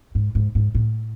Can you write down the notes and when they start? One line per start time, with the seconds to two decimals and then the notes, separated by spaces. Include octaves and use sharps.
0.15 G#2
0.35 G#2
0.55 G#2
0.75 A2